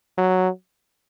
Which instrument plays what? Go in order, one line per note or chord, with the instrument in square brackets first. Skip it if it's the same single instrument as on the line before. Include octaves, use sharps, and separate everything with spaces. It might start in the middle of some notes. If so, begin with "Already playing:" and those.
[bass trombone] F#3